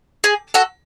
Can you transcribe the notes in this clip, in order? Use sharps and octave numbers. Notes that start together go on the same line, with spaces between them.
G#4
F#4 A4